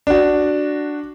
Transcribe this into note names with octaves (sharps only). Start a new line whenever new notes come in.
D4 F#4